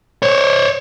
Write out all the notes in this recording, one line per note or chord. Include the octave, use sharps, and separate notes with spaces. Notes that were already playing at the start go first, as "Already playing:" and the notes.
C5 C#5